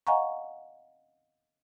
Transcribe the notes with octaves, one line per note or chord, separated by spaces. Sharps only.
D#5 F5 F#5 G#5 A#5 C#6